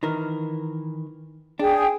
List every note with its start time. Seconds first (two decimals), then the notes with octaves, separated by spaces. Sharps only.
0.03 D#3 E3 A#4
1.59 D4 G#4 G5